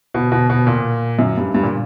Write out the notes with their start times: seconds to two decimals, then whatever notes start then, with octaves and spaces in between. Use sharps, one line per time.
0.14 B2
0.32 B2
0.50 B2
0.67 A#2
1.19 F#2
1.37 G2
1.54 G2
1.63 A#2